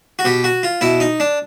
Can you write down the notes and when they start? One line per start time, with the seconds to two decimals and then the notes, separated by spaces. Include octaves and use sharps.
0.19 F#4
0.25 B2 G4
0.44 F#4
0.63 F4
0.81 B2 E4
1.00 D#4
1.20 D4